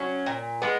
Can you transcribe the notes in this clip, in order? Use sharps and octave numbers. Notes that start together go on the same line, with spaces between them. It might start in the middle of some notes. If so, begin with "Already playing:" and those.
Already playing: F#3 C#4
A#2
G#3 B3